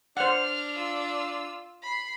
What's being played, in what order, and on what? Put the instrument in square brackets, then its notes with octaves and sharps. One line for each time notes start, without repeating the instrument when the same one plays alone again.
[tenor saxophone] D4 [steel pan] C5 F#5 [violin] F6
[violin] F4 E6
B5 C7